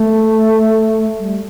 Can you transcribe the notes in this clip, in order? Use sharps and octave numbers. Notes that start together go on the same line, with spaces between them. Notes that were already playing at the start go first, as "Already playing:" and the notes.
Already playing: A3
G3